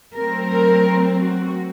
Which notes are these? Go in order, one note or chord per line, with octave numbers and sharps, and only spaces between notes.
F#3 A3 C4 A#4
A#4
F#4